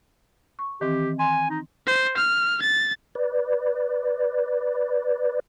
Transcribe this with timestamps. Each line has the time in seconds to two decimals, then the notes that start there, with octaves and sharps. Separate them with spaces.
0.59 C#6
0.81 D#3 E3 C4 G4
1.19 G#5 C6
1.50 D#4
1.86 C5
2.17 F6
2.62 A6
3.15 B4 D5